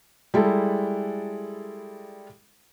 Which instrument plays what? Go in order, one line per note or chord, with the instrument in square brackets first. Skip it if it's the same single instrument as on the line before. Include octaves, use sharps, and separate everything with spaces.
[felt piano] G3 G#3 E4 A4